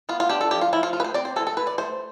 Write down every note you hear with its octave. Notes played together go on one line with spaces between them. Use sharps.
B3 F4
F4
D4 G4
A4
F3 G4
F4
F3 E4
F4
A3 F4
B4
C5
C4 D5
C5
E3 A4
A4
E3 B4
D5
A3 C5